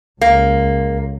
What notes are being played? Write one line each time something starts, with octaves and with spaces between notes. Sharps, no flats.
C#2 A#3